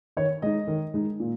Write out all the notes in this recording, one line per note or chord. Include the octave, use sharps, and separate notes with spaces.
D#3 C#5
G#3 D#4 D#5
D#3
G#3 D#4
A#2